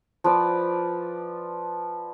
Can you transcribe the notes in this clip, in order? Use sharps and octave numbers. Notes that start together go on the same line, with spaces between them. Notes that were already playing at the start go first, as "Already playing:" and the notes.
F3 B4 D5